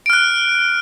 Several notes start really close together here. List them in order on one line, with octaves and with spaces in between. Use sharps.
D7 F6 F#6